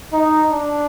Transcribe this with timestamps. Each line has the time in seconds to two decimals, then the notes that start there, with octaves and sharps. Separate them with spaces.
0.13 D#4
0.52 D4